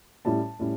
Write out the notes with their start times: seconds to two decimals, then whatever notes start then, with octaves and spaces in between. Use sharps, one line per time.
0.25 A2 G3 C#4 E4 A5
0.59 A2 G3 C#4 E4